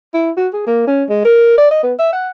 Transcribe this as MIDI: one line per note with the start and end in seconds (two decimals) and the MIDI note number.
0.14 0.30 64
0.37 0.48 66
0.53 0.64 68
0.66 0.83 58
0.87 1.04 61
1.09 1.22 56
1.25 1.56 70
1.57 1.69 74
1.71 1.81 75
1.83 1.93 59
1.99 2.10 76
2.13 2.29 78